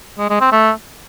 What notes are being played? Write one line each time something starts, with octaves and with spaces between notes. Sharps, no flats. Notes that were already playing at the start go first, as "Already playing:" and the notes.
G#3
G#3
C4
A3